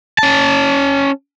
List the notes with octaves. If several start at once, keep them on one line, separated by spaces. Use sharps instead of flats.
C#4 A5